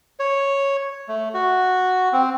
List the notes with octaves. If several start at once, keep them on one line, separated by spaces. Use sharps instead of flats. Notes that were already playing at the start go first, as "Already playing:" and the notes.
C#5
A3
F#4
C4